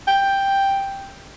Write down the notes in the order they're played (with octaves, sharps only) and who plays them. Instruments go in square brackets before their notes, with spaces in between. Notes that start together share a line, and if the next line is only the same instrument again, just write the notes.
[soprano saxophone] G5